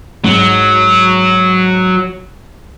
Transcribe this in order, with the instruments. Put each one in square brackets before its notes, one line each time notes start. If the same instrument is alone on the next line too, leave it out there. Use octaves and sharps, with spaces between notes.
[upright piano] G#2 [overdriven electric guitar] F#3